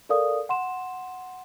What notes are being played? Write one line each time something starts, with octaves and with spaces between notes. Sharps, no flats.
A4 A#4 D5 F5 D#6
F#5 C6 E7